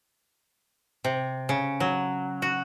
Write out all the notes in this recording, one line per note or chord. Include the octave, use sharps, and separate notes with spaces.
C3
C#3
F#3
F#4